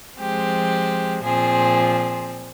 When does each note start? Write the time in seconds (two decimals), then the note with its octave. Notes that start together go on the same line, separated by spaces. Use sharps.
0.19 F3 G#3 C4 G4
1.24 A#2 F3 C4 G#4